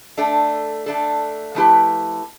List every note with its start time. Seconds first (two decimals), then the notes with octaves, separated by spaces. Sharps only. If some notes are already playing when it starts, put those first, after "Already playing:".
0.17 A3 D4 A4
0.86 A3 D4 A4
1.55 F3 A3 E4 G4 B4